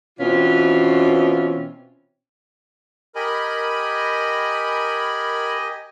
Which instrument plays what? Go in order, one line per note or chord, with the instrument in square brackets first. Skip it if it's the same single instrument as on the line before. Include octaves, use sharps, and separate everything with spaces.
[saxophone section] B2 E3 C4 C#4 F4
[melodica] G4 D#5 G#5 [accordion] A#4 B5